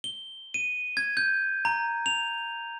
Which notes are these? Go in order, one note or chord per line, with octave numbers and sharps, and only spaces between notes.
G7
D#7
G#6
G6
A#5
F7